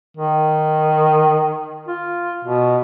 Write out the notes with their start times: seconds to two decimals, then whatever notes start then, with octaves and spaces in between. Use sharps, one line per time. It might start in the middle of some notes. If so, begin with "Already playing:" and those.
0.17 D#3
1.88 F4
2.45 B2